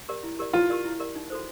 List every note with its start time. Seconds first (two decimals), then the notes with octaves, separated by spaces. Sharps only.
0.09 G4 A#4 D5
0.23 E4
0.39 G4 A#4 D5
0.53 E4 F4
0.70 G4 A#4 D5
0.85 E4
1.00 G4 A#4 D5
1.15 D#4
1.30 F#4 A4 C5